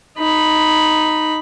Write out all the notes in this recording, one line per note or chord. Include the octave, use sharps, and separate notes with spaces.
D#4 B5